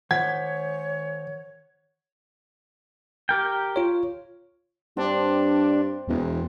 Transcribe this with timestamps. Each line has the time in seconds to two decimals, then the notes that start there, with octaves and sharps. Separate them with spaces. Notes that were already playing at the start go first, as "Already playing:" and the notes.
0.11 D#3 C5 C#5 F#5 G#6
3.29 G4 A#4 G5
3.76 F4 C#5
4.97 G2 C4 D4
6.08 E1 E2